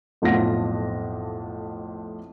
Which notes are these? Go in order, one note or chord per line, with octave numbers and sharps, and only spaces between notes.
B1 F2 A2 F4 F#5 A#6